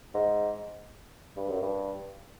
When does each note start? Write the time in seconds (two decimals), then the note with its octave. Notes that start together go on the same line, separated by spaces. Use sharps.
0.14 G#2
1.37 G2
1.49 F#2
1.62 G2